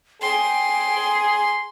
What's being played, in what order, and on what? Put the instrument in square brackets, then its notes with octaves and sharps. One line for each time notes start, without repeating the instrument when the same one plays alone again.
[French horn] G#4 [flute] G5 [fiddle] C6